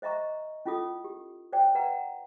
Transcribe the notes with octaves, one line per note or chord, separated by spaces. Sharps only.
C5 D#5 E5 A#5 C#6
C#4 E4 F4 A4 D#6
G4
C5 D5 G5
B4 D5 F#5 A#5